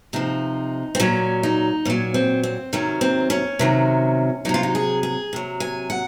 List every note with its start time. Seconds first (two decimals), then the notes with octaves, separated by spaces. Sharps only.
0.13 C3 F3 D#4
0.95 C4
1.00 A#2 F#3 C#4
1.43 D#4
1.85 A#2 F#3 C#4
2.14 C4
2.43 C4
2.73 C3 D#3 F#3 C#4
3.01 C4
3.30 C#4
3.59 C3 D#3 F#3
4.45 F#3 D#4
4.49 C3 F4
4.63 D#4
4.75 G#4
5.03 G#4
5.33 C3 F#3
5.60 G#5
5.90 F#5